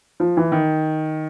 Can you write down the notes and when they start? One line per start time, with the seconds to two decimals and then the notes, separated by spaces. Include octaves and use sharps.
0.20 F3
0.37 E3
0.52 D#3